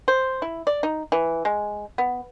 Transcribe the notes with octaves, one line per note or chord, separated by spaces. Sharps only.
C5
E4
D5
D#4
E3
G#3
B3